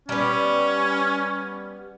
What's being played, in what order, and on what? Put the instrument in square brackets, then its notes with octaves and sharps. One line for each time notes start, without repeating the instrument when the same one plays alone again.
[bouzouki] G3 B3 [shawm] C#4